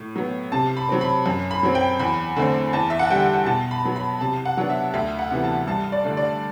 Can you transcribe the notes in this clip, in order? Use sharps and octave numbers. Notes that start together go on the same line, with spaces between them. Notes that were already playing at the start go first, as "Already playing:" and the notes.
Already playing: A2
F#3 B3
C3 A5
B5
F#3 C4
B5
F#2
B5
F#3 C4
G5
E2 B5
D3 A3 C4
E2 A5
E5
F#5
D3 G3 G5
B2 A5
B5
F#3 B3
B5
C3 A5
F#5
F#3 B3 D4
E5
D2 E5
F#5
C3 E3 B3
A5
G2 A5
D5
D3 A3 D4
D5